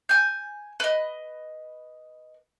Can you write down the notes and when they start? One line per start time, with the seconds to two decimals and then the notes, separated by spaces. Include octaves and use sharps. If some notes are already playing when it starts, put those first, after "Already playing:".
0.09 G#5 G6
0.80 B4 D#5